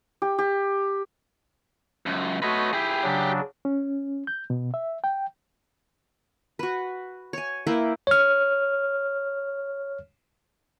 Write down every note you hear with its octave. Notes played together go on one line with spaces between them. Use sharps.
G4
G4
C#2 F#2
A3 F#4 B4 C#5 D#5
E4 G4 G#4 G5
C#3 F#3 D4
C#4
G6
B2
E5
G5
F#4 B4
C#5 G#5
A#3 E4 B4 G5
C#5 F6